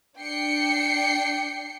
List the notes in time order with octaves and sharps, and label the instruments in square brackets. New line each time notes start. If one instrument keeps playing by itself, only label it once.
[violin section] D4 G5 C7 C#7